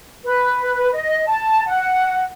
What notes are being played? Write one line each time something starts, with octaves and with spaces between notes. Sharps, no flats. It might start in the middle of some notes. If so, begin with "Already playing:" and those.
B4
D#5
A5
F#5